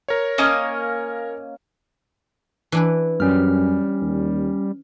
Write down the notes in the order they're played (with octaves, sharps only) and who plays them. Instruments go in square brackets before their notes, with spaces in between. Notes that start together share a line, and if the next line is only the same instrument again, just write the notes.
[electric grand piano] A#4 C#5
[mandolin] A#3 C#4 D#5
[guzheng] E3 D4 B4
[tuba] F#2 [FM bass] G3 [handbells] C#4 F6
[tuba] D#2